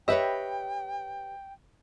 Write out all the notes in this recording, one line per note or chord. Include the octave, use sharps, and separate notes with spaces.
G4 B4 C#5 D#5 E5 G5